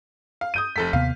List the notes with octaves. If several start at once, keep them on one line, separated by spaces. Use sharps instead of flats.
F5
D#6 G6 D#7
F1 A4 B6
D#2 C3 B3 F5